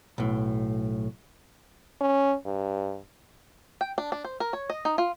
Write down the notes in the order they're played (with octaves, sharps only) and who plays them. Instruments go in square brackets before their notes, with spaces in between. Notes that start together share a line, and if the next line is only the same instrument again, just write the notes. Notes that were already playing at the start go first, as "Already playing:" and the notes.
[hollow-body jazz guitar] B1 A2
[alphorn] C#4
G2
[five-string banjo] G5
D4
D4
C5
A#4
C#5
D#5
D#4
F4